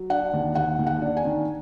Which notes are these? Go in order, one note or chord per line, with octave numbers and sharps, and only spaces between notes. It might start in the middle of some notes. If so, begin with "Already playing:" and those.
Already playing: F#3
D4 F#5
D#2
D#2 F#5
D#2
F#5
D4
G#5
D#3